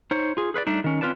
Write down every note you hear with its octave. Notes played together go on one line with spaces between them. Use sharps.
D#4 C5 C#5
F4 G#4
G#4 B4 C5 D5
G3 A3 D4 D#4
D#3 C#4
C4 C#4 F4 B4 D5 A5